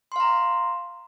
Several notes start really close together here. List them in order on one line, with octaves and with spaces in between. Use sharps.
C6 F5 A#5